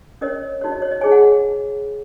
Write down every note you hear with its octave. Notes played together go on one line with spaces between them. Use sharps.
C#4 A#4 C#5 D#5
D#4 F#4 C#5
D#5
C#5
D#5
D#4 G#4 C#5 G#5
F#5